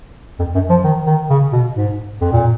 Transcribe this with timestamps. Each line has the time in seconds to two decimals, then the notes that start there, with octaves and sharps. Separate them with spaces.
0.39 F2
0.55 F#2
0.69 F3
0.84 D#3
1.06 D#3
1.30 C#3
1.52 B2
1.76 G#2
2.21 F2
2.32 A#2